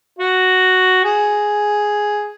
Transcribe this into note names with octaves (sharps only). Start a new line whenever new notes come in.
F#4
G#4